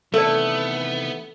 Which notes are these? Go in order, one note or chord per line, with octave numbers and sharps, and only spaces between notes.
C3 D#3 E3 A3 B3 A4 A#4 D5